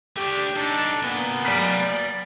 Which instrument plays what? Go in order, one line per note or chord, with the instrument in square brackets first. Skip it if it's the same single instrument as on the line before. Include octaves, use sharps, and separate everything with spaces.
[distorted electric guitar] A3 D4 [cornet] G4
[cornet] D4 [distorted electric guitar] D#4 A4
[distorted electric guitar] A#3 G#5 [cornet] B3
[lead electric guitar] D5 B5